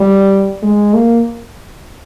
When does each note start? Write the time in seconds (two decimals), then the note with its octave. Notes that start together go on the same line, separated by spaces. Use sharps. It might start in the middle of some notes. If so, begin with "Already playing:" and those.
Already playing: G3
0.62 G#3
0.94 A#3